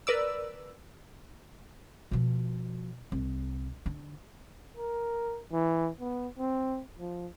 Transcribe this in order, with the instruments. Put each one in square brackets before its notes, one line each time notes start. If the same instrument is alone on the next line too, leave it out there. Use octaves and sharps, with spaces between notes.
[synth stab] A#4 B4 D5 E6
[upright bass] B2 F3
C2
D3
[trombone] A#4
E3
B3
C4
F3